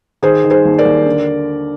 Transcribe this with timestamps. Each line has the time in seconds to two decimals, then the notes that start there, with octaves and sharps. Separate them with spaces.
0.22 D#3 G#4 C5
0.44 D#3
0.50 G#4 C5
0.65 D#2
0.78 A#4 D5
0.85 D#2
1.06 D3